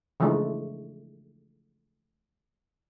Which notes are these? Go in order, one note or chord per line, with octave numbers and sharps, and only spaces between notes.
C#3 E3 F3 G#3 A3 D4